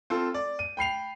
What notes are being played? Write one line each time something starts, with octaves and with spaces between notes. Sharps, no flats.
C4 F4 A4
D5
D#7
G5 B5 C7 F7